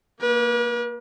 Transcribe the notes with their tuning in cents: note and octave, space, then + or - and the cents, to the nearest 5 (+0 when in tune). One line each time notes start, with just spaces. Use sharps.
A#3 +0 B4 -40